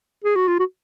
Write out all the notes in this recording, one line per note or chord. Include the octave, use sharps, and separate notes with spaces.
G#4
F#4
F4
F#4